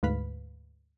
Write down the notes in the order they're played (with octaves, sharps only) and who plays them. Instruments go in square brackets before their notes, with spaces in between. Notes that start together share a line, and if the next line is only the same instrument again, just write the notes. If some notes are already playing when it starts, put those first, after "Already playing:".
[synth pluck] D2 G#2 B4 F5 B5